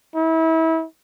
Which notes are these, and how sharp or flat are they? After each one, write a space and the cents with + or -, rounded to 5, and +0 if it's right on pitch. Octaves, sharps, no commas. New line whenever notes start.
E4 -30